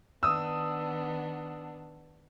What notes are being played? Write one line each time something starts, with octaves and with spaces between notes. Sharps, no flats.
D#3 B3 D4 D#6 E6